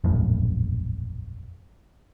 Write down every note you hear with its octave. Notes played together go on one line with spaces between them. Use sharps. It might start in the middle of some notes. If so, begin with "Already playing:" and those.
E1 A#1 F#2 A2